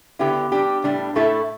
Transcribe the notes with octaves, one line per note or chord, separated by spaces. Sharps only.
D3 B3 E4 G4
G3 D4 G4
A2 G3 D4
A2 A3 E4 A4